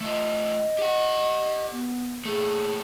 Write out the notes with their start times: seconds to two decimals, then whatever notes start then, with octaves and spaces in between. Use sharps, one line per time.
0.01 A3 F4 D#5
0.79 G4 F#5
1.71 B3
2.25 A#2 A3 G#4